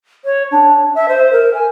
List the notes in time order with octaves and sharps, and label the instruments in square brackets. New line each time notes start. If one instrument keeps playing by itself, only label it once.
[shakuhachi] C#5
D4
E5
C5
A#4
G#5